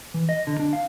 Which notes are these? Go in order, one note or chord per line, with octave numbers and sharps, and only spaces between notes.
E3
D#5
D3
D4
F5